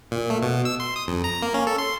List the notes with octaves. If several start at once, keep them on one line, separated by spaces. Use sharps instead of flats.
A#2
A3
B2
E6
C6
D#6
F2
A#5
A#3
C#4
A4
C6